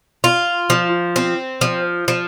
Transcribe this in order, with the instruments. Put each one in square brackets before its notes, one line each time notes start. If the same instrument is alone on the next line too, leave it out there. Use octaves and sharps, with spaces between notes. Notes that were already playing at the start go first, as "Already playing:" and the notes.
[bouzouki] F4
F3
C4
F3
F3